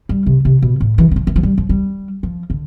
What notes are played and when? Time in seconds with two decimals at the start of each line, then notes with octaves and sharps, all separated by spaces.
0.09 G3
0.26 C3
0.45 C3
0.62 B2
0.81 A2
0.98 E3
1.11 E3
1.16 F3
1.27 E3
1.36 F3
1.43 G3
1.58 F3
1.69 G3
2.23 F3
2.50 D3